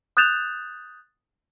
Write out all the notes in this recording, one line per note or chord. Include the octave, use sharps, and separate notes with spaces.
D#6 F#6 G6 A6 E7 F7